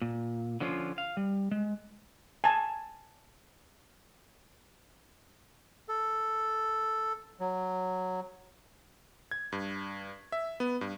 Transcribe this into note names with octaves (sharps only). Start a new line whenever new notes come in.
A#2
D3 F3 C#4 F4
F5
G3
G#3
G#5 A5
A4
F#3
G#6
G2
E5
B3
G2